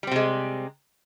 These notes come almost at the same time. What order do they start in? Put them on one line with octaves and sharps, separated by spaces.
G3 C4 C3 G#3